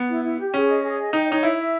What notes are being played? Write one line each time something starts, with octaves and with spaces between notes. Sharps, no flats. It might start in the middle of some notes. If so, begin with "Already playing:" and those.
Already playing: B3
E4
E4
G4
C#4 G#4
D#5
G#4
D#5
D#4 G5
D#4 C#5
E4 E5
E5